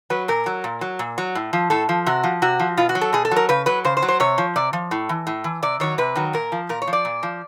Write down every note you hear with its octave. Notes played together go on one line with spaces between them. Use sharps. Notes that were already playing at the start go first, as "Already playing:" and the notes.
F#3 B4
A#2 A#4
F#3
A#2
F#3
A#2
F#3
A2
F3
A2 A4
F3
C3 F#4
F3
C3 F#4
F3
B2 F4
F#4
F#3
A4
B2 G#4
A4
F#3
A#4
C#3 B4
F#3 B4
C#3 C5
C5
F#3
C5
C3 C#5
F3
C3 D5
F3
A2
E3
A2
E3
C3 D5
D#3 F#3 C#5
C3 B4
D#3 F#3
A#2 A#4
F3
A#2 A#4
C#5
F3
D5
A#2
F3